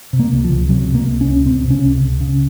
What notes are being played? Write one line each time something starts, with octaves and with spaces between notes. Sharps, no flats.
C3
A#3
C#2
F3
C#2
C3 F#3
C3
A#3
C#2
C#4
C#2
C3 C4
C3
C#4
C#2
C#2
C#3